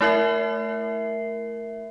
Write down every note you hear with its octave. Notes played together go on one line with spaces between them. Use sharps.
A3 E4 A#4 E5 C7